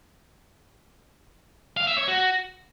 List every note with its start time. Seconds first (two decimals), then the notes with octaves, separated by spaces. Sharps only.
1.77 F5
1.87 E5
1.98 C#5
2.08 F#4